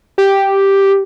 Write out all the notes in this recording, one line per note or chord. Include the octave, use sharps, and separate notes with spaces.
G4